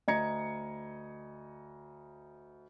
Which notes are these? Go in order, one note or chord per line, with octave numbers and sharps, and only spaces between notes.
D2 D#5 A#5 G#6 C#7